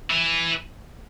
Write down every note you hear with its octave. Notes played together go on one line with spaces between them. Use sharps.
E3